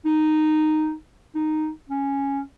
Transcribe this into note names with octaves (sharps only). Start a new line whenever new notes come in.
D#4
D#4
C#4